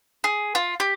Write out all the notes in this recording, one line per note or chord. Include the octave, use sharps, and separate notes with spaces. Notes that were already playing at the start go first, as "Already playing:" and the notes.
G#4
F4
G4